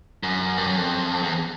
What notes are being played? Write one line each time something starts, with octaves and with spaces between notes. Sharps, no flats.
F#2
G2
F#2
F2
E2